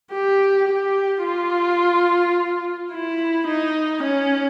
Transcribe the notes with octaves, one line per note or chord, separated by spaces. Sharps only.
G4
G4
F4
E4
D#4
C#4